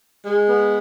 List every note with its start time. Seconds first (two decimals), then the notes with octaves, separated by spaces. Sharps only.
0.23 G#3
0.48 B3